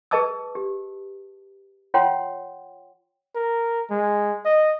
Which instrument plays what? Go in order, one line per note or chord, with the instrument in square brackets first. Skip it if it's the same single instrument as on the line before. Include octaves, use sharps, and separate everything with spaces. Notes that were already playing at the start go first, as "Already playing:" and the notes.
[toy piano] G#4 B4 D#5 A5 D6 E6
G4
F4 C#5 F#5 G5 C6
[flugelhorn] A#4
G#3
D#5